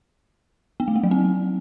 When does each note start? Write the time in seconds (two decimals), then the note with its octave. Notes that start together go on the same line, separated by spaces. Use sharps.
0.80 B3
0.88 A3
0.96 A#3
1.03 F#3
1.11 C4